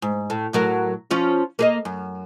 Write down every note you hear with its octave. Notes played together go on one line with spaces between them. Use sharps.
G#2
A2
A2 F#3 A#4
F3 C#4 F4
A#3 G#4 D#5
F#2